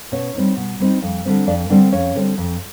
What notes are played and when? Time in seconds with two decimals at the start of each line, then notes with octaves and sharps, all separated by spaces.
0.12 B2 C#4 C#5
0.35 G3 C4 D#4
0.57 B2
0.80 G3 C4 D#4
1.02 F2
1.25 D3 G3 C4
1.47 F2 D4 D5
1.69 D3 G3 C4 D4 D5
1.92 F2 C#4 C#5
2.15 D3 G3 C4
2.38 F2